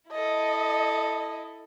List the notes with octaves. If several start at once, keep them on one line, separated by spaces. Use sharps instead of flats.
E4 A4 D#5